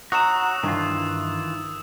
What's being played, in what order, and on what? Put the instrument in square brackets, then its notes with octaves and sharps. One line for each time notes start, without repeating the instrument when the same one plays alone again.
[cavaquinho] D#4 C#5 A#5 [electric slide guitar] F#4 [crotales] D#6 E6 E7
[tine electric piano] G2 [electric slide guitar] D#3 E3 F4